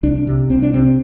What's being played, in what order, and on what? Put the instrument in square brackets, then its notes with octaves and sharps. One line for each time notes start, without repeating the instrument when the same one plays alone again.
[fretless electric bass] C2 D4
C3
C2 C4
D4
C3 C4